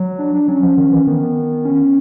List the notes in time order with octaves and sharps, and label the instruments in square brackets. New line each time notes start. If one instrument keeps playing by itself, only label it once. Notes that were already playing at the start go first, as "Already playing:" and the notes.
Already playing: [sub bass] F#3
[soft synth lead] D4
D4
[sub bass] F#3 [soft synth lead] C#4
[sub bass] F3
D#3
E3
[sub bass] D#3 [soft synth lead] B3
[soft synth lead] B3
C#4